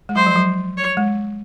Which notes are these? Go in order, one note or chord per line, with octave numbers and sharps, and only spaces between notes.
G#3
F#3 C5
F3
F#3
C#5
G#3